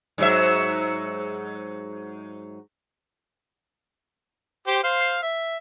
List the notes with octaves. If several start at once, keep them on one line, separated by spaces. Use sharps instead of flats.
G#2 F#3 E5
G4 C5
C5 F5
E5